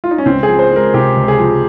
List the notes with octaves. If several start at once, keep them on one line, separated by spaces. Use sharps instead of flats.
F4
D#4
C#4
C#2 C4
G#4
F3
C5
G#3
A#4
C3 G4
C#2
G#4
F3